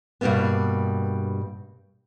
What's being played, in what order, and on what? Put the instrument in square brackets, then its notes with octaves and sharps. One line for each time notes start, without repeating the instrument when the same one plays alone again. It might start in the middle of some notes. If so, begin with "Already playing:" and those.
[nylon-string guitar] G2 B2 G3 A#3 B3